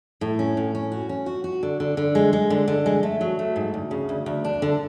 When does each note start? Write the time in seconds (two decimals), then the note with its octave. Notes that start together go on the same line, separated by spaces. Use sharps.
0.21 A2
0.39 C#4
0.57 A2
0.75 C#4
0.92 F#4
1.09 C#4
1.26 F#4
1.44 F#4
1.63 D3
1.80 D3
1.97 D3
2.15 G#3
2.33 G#3
2.50 D3
2.68 D3
2.86 G#3
3.03 A3
3.21 F#3
3.39 A3
3.56 G#2
3.74 D2
3.91 C#3
4.09 D2
4.26 D2
4.44 D4
4.62 D3